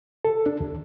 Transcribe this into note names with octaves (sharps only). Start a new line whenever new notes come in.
A4
D4
D#2